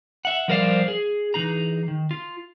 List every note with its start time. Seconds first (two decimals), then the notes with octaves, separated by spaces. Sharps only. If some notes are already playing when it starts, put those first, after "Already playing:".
0.25 E5 F#5
0.48 F3 G3 A#4 C5 D5 F5
0.88 G#4
1.34 E3 D#4 G#4 A#5
1.88 D#3
2.11 F4